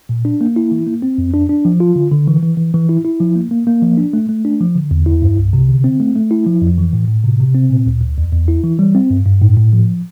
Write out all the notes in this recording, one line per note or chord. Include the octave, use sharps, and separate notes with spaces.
A#2
D4
A#3
E4
E3
A#3
C4
F2
D4
D4
F3
F4
D3
D3
E3
E3
E3
E3
E4
E4
F3
A#3
A#3
A#3
F3
D4
A3
A3
D4
F3
D3
E2
E4
G2
C2
C3
D3
C4
A3
A3
E4
F3
F2
E3
A2
A2
C3
C3
C4
A#2
D2
D2
E2
E2
E4
E3
G3
C4
G2
G2
A2
A2
F3